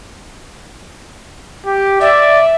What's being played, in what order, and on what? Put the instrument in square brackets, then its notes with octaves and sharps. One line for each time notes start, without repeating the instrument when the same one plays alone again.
[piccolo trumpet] G4
[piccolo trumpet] D5 [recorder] E5